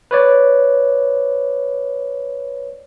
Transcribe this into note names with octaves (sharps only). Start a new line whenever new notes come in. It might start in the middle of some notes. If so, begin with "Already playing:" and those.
B4 C#5 D5